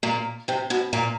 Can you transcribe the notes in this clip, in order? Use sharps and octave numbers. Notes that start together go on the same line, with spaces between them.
A#2 A#3
C3 C4
B2 B3
A#2 A#3